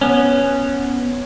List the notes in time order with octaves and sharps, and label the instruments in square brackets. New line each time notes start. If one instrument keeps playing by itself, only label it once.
[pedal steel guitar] B3 C#4